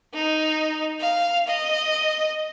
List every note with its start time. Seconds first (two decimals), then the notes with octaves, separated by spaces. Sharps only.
0.14 D#4
1.00 F5
1.47 D#5